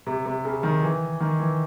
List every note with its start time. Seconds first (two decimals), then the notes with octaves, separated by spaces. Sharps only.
0.07 C3
0.26 C3
0.45 C#3
0.63 D#3
0.83 E3
1.20 D#3
1.40 E3